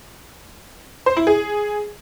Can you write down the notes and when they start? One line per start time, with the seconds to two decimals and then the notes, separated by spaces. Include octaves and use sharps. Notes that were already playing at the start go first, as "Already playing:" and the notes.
1.06 C5
1.17 E4
1.27 G#4